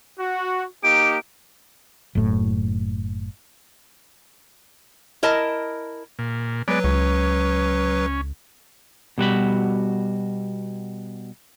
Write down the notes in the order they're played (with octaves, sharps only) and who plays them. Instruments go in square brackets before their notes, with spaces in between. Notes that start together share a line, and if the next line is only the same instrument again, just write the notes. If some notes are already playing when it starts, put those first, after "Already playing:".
[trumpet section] F#4
[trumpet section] A#3 D#4 G4 [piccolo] D7
[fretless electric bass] F#1 A2
[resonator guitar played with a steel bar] E4 A#4 D#5 A5
[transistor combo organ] A#2
[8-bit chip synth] F#3 B4 [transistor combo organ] G#3 B3 D5
[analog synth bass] C#2 [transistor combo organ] C#4
[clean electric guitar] B2 G3 F#4 B5